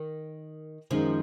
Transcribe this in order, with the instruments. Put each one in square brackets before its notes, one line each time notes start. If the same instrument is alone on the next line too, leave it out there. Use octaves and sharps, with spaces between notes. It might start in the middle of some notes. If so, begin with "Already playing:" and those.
Already playing: [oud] D#3
[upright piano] F#2 D#3 G#3 D#4 [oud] F3